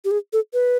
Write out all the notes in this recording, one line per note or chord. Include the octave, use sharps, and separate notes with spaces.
G4
G#4
A4
B4